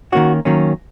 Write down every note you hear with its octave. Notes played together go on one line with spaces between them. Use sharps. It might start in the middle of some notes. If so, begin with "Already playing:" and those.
D#3 A#3 C#4 F#4
D#3 F#3 A#3 C#4